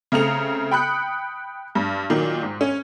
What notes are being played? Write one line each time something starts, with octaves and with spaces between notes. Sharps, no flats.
C#3 A3 C4 A#5 C#7 F7
G5 B5 D#6 F#6 C#7
G2
A#2 D#3 F#3
G#2
C#4